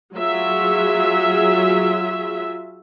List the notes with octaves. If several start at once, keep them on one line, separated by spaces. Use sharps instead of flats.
F#3 F4 F#4 G#4 E5